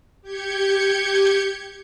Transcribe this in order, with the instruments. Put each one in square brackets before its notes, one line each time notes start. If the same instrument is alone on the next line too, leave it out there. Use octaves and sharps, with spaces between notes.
[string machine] G4 G6 G#6 C#7